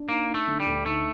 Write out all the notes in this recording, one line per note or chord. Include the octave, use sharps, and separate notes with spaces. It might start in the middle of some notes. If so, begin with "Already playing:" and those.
Already playing: D4
A#3 D#4
D#4
A3
D3
G3
D2
A3 D#4